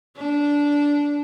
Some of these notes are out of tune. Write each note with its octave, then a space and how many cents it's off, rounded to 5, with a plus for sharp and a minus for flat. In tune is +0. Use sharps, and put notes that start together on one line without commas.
D4 -15